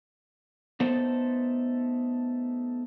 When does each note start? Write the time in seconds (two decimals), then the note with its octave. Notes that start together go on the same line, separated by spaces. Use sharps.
0.80 A3 B3 D#4 A4 C5 D5